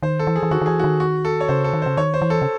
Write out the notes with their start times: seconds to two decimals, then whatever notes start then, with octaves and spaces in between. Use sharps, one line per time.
0.02 D#3 C5
0.19 A4
0.27 E3
0.36 G#4
0.43 E3
0.51 D#3 F#4
0.62 D#3
0.66 E3 G#4
0.79 D#3 F#4
1.00 F#4
1.25 A4
1.40 C#5
1.48 C#3 C5
1.64 A4
1.73 D#3
1.82 C#3 C5
1.97 D#3 C#5
2.14 C5
2.22 E3
2.30 A4
2.42 C#3